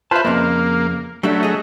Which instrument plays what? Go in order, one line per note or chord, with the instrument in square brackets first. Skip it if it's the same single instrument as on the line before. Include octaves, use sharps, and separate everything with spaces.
[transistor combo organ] F4 B4 C5 [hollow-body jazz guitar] E5 A5
[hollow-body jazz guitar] F2 C#3 [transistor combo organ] A#3
[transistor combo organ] F#3 A3 [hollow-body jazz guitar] G3 D4 E5
[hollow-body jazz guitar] G#4 D#5